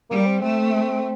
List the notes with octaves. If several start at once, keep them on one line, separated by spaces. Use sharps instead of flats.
G3 A#3
C4
A3 C4